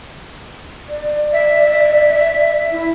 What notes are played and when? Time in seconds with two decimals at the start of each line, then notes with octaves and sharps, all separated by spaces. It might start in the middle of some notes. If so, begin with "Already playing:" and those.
0.89 D5
1.33 E5
2.72 E4